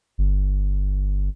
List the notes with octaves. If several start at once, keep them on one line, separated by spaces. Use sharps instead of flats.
G1